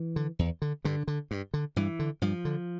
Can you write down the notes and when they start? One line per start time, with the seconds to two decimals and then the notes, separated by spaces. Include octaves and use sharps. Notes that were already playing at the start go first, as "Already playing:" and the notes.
Already playing: E3
0.16 D3
0.39 E2
0.62 D3
0.85 G2 D3
1.08 D3
1.31 G2
1.54 D3
1.76 G2 E3
1.99 D3
2.22 G2 F3
2.45 D3